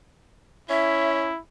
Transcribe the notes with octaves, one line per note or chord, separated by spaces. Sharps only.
C#4 E4 E5